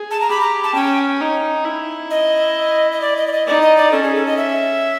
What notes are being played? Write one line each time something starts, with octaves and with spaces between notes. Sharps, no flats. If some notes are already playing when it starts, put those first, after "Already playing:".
Already playing: G#4
A5
A#5
G4 B5
A#5
A5
C#4 G5
D#4
E4
D#5
D#5
D5
D#5
D5
D#5
D#4 D5
D#5
D5
C#4 A4
G#4
A4
D#5
E5